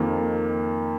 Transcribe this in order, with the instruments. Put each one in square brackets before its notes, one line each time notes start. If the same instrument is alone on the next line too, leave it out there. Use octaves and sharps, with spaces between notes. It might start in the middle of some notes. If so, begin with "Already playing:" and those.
Already playing: [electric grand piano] F2 D#3 A#3